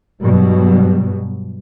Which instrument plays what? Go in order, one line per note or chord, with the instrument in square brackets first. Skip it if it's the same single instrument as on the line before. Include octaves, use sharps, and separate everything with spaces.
[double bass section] G2 B2 F#3 G3